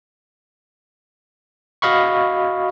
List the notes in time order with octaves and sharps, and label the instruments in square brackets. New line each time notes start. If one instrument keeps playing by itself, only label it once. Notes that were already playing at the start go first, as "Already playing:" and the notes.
[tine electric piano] F#4 D#5 F5 B5 C#6